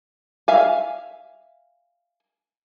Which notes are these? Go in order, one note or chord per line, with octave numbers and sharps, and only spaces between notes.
E5 F5 G#5